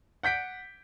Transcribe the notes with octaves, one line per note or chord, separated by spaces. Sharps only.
F#5 G6 B6 D7